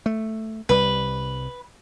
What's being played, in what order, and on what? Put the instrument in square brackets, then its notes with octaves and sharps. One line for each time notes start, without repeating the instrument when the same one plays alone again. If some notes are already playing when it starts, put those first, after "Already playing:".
[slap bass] A3
[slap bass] C2 G3 [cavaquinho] B4